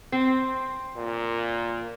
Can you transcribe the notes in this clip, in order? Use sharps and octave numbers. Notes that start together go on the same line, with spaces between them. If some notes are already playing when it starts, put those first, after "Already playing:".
C4
A#2